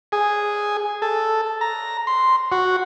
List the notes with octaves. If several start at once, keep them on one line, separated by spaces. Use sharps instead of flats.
G#4
A4
A#5
C6
F#4